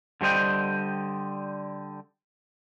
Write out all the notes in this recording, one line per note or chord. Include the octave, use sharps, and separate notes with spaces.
D3 G3 C5 D#5 G5